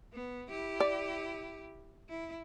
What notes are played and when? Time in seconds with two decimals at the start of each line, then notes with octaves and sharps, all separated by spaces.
0.14 B3
0.49 E4 G4
0.80 D5
2.09 E4